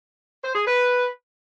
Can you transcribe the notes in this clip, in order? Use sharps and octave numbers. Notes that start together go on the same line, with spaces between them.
C5
G#4
B4